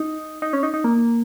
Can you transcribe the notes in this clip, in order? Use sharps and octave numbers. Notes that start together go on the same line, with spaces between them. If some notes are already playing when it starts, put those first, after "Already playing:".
Already playing: D#4
D#4
C#4
D#4
D#4
A#3